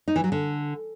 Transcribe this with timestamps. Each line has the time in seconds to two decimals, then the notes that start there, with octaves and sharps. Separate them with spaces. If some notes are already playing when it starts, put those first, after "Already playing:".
0.08 D#4
0.16 E3
0.24 F#3
0.32 D3